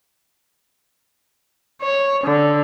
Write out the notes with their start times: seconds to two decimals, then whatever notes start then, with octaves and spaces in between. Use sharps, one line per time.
1.83 C#5
2.24 D3